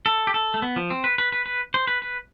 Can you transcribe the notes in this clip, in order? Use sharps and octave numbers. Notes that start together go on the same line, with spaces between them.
A4
G4
A4
A3
B3
F3
C4
B4
B4
B4
B4
C5
B4
B4